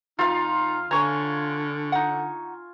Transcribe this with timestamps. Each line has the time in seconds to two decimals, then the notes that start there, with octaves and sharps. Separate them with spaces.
0.19 F2 D#4 F4 F5
0.91 D3 C#5 G#5 A#5 C#6
1.92 D#4 F#5